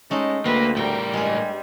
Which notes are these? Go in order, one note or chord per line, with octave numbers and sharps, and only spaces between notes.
G#3 A3 C#4 D#4
D2 A#3 C4 B4
A2 G3 A#4 G5
G2 G#3 G#4